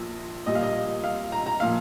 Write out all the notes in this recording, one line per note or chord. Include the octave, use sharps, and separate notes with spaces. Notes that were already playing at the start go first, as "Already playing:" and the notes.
Already playing: A#1 A#2 F3
A#1 A#2 G3 D#5
F5
D#5
F5
A#5
A#5
A#2 F3 F5